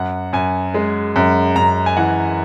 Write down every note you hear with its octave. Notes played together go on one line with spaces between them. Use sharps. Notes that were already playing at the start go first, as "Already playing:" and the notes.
Already playing: F#2 F#5
F#2 G#5
G#3
F#2
F#2 A#5
G#5
E3 F#5